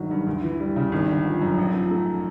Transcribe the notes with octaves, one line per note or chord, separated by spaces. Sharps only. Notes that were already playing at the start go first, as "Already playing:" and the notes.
Already playing: G1 D#3 F#3
G2
D2
E3
G3
C#3
G#1
D3
F3
F#2
A1
F3
A3